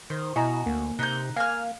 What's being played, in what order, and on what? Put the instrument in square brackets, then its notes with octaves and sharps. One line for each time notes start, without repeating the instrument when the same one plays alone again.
[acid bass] D#3 [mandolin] C5
[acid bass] B2 [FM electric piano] E4 D#5 A#5 [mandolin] F#4 [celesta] G#5
[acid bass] D2 [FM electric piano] A#3
[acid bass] C3 [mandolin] D#4 G6 [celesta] F#6
[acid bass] A#3 [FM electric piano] F5 [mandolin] G#5 F6